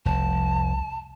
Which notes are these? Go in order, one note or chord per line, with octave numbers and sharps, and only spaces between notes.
F1 C2 A5